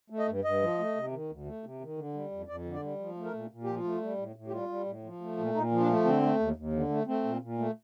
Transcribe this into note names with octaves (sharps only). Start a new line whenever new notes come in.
A3
D#5
G2
G2 D#5
F3
A3
C3
D#3
D2
A3
C3
D#3
D3
G3
F2
F2 D5
D3
D5
G3
F3
A3
A#4
A#2
A#2
F3 G4
F4
A3
G3
A2
A2
G4
G3 F4
G3
A2
F3
A3
A#2
A#2 D#4
F3
D4
A3
D3 C4
A3
D#2
D#2
D3
A3
A3 C4
A#2
A#2
A3